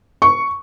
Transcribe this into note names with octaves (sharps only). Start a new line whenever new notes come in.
C#6